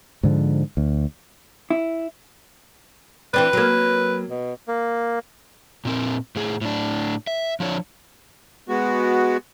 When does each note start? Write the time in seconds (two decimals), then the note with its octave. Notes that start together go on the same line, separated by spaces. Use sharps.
0.23 G#2 D3 D#3 F3
0.77 D2
1.70 E4
3.34 E3 C4 D4 B4
3.53 F#3 A#3
4.30 B2
4.67 A#3
5.85 A#2 C4 A#4
6.36 A2 G#4
6.61 A2 D4
7.27 E5
7.60 F3 D4 C#5
8.69 G#3 B3 F#4